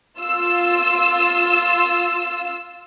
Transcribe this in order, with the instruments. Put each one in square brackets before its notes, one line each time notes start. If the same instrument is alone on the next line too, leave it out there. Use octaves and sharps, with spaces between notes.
[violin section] F4 E6